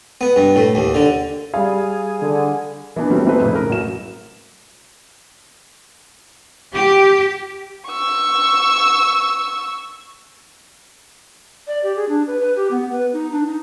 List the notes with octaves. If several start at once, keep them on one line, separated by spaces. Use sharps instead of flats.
B3
G2
A2
D#2
D3
G3 G#4 F5
D3
E3 B3 D4
E3 F#3 G3 A3 C4 C#4
E3 A3 C4 D#4 B4
F2 A2 C#3
A#4
A1 F#3 E7
G4
C#6 E6
D5
G4
G#4
D4
B4
B4
G4
B3
B4
D#4
D4
D#4